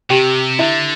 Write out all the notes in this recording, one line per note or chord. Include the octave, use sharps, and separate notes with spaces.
C3 G4 G5
D3 E4 E5